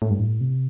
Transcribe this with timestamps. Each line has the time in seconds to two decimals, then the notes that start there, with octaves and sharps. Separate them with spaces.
0.02 A2
0.10 G2
0.19 A2
0.41 C3